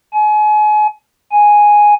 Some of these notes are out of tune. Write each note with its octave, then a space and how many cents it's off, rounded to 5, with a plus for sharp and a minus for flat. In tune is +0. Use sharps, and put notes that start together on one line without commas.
G#5 +35
G#5 +0